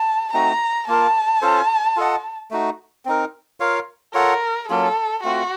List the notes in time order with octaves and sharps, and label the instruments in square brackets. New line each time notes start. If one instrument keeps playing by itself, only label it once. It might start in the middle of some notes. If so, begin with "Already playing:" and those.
Already playing: [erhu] A5
[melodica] A3 C4 D#4 F#4 [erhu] A#5
[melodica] A#3 F4 A#4 [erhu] A5
[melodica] C#4 F4 A4 C5
F4 A4 D#5 F#5
A3 D#4 F#4
C4 D#4 A#4
F4 A#4 C#5 F5
[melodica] F4 A4 C#5 F#5 [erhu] A#4
[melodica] F#3 A#3 C#4 F4 [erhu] A4
[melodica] A3 C4 F4 [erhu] F#4